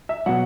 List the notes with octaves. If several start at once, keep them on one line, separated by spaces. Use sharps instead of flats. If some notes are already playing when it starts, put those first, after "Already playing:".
E5
B2 F#3 F#5